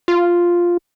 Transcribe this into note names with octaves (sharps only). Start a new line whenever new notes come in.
F4